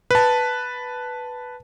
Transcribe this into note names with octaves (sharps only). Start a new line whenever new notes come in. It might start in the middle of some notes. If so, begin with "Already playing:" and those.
B4 A5